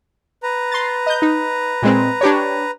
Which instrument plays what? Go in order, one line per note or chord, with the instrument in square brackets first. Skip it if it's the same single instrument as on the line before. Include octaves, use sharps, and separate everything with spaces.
[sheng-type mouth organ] B4 A#5
[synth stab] C6 A6
D#5 G6
D#4
A#2 G#3 C4
D4 G4 C#5